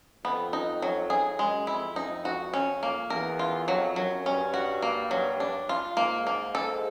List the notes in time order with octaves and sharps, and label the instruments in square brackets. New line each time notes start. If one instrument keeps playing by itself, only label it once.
[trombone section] F2 [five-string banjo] B3
[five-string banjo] D#4
F#3
G#4
[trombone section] F#2 [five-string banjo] G#3
[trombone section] F2 [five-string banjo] E4
[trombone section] F2 [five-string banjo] D#4
[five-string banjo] F#4
C#4
A#3
[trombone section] E2 [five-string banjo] A#4
[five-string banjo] F4
[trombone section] F2 [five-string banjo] F#3
[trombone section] F#2 [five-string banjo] F#3
[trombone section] G2 [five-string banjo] C#4
[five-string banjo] F#4
A#3
F#3
D4
F4
[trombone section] G#2 [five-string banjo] A#3
[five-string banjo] A#3
A4